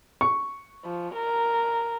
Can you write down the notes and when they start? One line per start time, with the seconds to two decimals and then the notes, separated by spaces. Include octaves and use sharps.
0.21 C#6
0.85 F3
1.15 A#4